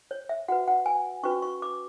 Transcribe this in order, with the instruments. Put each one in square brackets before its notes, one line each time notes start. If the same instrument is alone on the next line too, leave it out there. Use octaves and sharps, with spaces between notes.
[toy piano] C#5
E5
F#4 B4 F#5
F#5
G#5
C#4 F#4 B4 C#6
C#6
D6